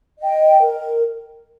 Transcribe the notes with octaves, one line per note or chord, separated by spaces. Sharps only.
D#5 G5
A#4